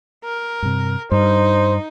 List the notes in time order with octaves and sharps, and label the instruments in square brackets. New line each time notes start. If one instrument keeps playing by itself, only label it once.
[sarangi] A#4
[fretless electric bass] G2 C3
[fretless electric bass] G2 [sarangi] D#4 [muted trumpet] C5